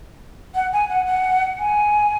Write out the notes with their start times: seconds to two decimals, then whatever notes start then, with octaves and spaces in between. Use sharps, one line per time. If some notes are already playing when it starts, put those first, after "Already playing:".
0.55 F#5
0.73 G#5
0.90 F#5
1.06 F#5
1.59 G#5